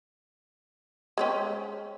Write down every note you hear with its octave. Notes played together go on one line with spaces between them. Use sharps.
G#3 C4 C#4